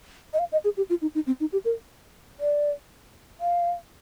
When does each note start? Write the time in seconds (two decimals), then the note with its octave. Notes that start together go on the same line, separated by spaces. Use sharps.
0.33 D#5
0.39 F5
0.52 D#5
0.64 G#4
0.77 G4
0.90 F4
1.02 D#4
1.15 D#4
1.27 C4
1.40 D#4
1.53 G4
1.65 A#4
2.40 D5
3.41 F5